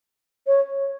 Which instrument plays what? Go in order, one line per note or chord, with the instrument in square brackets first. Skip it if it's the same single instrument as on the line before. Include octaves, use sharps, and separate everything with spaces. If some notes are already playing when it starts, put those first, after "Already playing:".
[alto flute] C#5